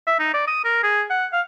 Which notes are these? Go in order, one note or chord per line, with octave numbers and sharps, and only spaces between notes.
E5
D#4
D5
D#6
A#4
G#4
F#5
F5